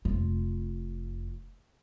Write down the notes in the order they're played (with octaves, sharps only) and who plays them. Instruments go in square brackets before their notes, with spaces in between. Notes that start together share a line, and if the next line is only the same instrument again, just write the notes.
[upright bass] F1 F4